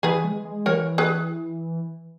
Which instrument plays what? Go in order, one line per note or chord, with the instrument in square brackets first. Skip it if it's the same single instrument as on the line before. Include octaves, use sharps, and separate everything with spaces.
[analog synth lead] E3 [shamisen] G#4 B4
[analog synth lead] G#3
G#3
[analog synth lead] E3 [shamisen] A#4 C#5
[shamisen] G#4 B4